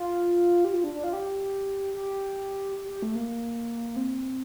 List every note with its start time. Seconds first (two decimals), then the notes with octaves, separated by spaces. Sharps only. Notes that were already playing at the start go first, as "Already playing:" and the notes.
Already playing: F4
0.65 G4
0.74 F4
0.84 D4
0.94 D4
1.04 F4
1.13 G4
1.95 G4
2.76 G4
2.89 G4
3.02 A3
3.15 A#3
3.96 C4